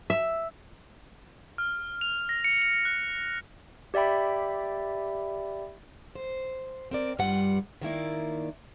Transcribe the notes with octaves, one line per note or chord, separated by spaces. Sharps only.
E5
F6
F7
A#6
C#7
F7
F#6
G4 D5 E5 G5 B5
C5
C4 A#4 D5
G2 G3 F4 F#5
D#3 A#3 E4 D5